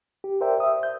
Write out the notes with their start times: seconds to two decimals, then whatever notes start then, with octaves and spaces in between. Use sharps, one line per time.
0.24 G4
0.41 A#4 C5 D5 E5 G5
0.60 E5 D#6
0.83 G6